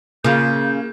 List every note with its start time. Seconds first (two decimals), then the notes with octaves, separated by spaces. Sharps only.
0.24 C#3 A#3 F4 G6